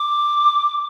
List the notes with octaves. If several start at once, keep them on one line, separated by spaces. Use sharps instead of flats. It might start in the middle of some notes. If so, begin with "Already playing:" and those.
Already playing: D6